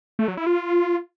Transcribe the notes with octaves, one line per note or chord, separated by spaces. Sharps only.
A3
F#3
E4
F4